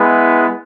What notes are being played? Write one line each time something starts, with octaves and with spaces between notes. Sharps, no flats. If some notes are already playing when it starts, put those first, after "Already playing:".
Already playing: G#3 B3 E4